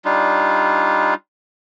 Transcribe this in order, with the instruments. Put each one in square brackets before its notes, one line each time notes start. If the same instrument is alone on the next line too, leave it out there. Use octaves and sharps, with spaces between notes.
[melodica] G3 D4 D#4 F4